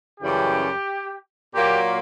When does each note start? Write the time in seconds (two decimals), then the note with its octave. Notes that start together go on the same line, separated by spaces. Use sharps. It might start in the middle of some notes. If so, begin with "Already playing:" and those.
0.20 F#2 C#3 E3 G3 G4
1.53 A#2 F#3 A#3 G4